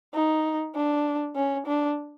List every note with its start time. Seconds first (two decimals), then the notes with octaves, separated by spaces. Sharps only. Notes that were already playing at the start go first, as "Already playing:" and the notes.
0.14 D#4
0.75 D4
1.36 C#4
1.66 D4